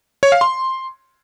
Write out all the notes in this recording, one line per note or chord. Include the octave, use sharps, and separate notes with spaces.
C#5
F5
C6